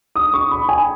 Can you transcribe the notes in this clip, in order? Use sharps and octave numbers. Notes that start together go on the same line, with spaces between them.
D#6
C#6
B5
G#5